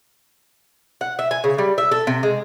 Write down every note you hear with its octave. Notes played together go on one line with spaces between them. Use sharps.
F#5
E5
G#5
C#3
G3
E5
A4
C3
G#3